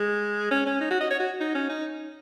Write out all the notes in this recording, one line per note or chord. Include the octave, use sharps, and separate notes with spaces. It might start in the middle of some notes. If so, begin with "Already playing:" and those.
Already playing: G#3
C#4
C#4
D#4
F#4
D#5
C#5
F#4
D#4
C#4
D#4